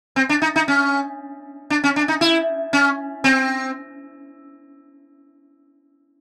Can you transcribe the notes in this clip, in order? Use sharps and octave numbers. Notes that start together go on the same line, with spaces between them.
C4
D4
D#4
D#4
C#4
D4
C#4
D4
D#4
E4
C#4
C4